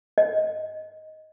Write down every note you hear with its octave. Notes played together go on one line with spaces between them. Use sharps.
D#5